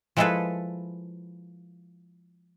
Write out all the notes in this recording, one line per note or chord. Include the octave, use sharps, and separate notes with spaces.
F3 G#3 E4 G#4 A4 B4